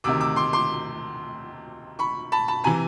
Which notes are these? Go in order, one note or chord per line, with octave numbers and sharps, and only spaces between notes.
D2 C3 D#3 D6 E6
D6 E6
C6 D6
C6 D6
B5 C#6
A5 B5
A5 B5
C3 E3 G#5 A#5